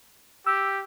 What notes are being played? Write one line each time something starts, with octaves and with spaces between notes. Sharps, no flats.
G4 E6